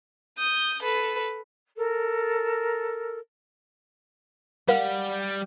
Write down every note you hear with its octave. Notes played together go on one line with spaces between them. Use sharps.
D#6 G6
A4 B4
A4 A#4
G3 A#4 F5 F#5